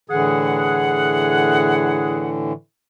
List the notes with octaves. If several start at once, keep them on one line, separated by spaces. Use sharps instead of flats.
A2 D3 E3 G#4 F#5